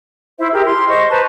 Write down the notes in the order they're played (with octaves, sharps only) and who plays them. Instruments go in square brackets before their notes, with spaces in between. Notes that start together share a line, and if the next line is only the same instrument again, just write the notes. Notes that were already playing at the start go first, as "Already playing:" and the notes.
[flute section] E4 C5 E5
G4 G#4 A#4
C6
C5 D#5 C#6
B4 C5 A5 A#5